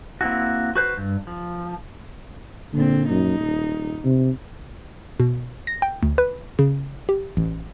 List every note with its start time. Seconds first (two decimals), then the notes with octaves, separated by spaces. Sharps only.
0.21 A#3 C4 E4 F#4
0.75 F#4 B4 C5
0.97 G2
1.27 F3
2.73 A#2 D3 C4
3.09 F#2 D#4
3.40 D#1
4.04 C3
5.20 B2
5.67 A#6
5.82 G5
6.03 D2
6.18 B4
6.59 C#3
7.09 G4
7.37 A1